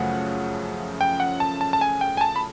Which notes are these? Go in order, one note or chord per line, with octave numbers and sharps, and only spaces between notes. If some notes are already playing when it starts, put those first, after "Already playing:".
Already playing: F#2 C#3 F3 A3 C#4 F#5
G5
F#5
A5
A5
A5
G#5
G5
G#5
A5
B5